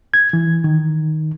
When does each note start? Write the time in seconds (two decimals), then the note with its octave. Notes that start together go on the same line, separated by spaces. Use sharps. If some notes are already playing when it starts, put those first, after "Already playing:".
0.14 G#6
0.33 E3
0.64 D#3